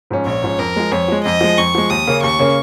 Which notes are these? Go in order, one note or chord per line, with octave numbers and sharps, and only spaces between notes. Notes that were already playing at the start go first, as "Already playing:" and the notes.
G#2 F3 C#4
A#1 C#5
G#2 F3 C#4
F2 A#4
F3 G#3
F2 C#5
F3 G#3
F2 D#5
F3 G#3
F2 C#6
F3 G#3
D#2 D#6
C#3 A#3 C#4
D#2 C#6
C#3 A#3 C#4